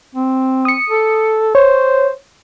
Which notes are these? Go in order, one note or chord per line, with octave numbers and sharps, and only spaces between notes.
C4
D#6 C#7
A4
C5 C#5